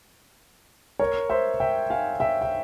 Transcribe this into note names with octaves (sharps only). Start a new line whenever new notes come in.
A#4 C#5
C5 E5
E5 G5
F5 G#5
E5 G5
G5